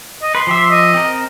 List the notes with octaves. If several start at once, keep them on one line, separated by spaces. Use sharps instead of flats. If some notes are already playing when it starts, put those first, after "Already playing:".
D#5
B4 C6
F3 G4 E5
D#5
C4 A#4